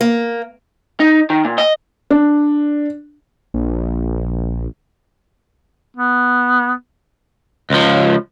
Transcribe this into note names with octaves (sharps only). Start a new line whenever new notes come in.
A#3
D#4
D#3
A#2
D#5
D4
A#1
B3
C#2 F3